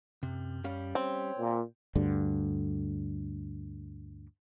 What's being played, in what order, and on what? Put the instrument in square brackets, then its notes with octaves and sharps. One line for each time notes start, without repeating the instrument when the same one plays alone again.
[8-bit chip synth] F#2 [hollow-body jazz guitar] C3
[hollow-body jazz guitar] G3 C#4 F5
[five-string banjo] C4 [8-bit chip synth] C#5
[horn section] A#2
[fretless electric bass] D2 G2 D3